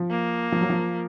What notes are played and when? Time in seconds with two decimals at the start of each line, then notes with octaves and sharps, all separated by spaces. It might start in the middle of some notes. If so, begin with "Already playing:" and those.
Already playing: F3
0.11 A#3
0.52 F3
0.61 F#3
0.70 F3